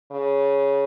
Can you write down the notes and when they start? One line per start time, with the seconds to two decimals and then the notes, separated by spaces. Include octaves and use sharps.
0.11 C#3